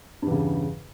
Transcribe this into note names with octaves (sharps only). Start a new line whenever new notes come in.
E2 G2 C#3